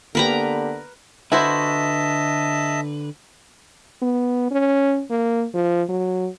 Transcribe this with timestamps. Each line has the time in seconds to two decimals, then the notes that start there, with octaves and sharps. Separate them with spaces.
0.15 D3 A#3 B3 G4 A#4 B4 A#5
1.32 D3 E4 F#4 B4 C5 D#5 E5 A5
4.02 B3
4.51 C#4
5.10 A#3
5.54 F3
5.89 F#3